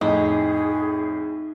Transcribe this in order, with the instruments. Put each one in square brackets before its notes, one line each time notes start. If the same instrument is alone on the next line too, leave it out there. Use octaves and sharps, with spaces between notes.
[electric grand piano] F2 A2 [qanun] D#4 [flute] G#4 [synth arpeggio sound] D#5